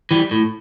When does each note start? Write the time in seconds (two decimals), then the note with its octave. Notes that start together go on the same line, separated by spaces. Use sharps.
0.11 E3 G3
0.31 A2